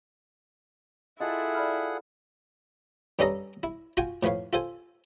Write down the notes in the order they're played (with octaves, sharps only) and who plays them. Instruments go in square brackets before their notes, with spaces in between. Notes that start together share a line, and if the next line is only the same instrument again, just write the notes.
[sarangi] E4 [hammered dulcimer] F4 A4 [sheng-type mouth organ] G#4 F#5 [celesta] D#5
[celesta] D5 B5 F6
[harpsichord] G2 G3 C#4 A4 D#5 A#5
E4
F4 F#4 G5 G#5 C#6
A2 F3 B4 C#5 F5
F4 A4 C5 G#5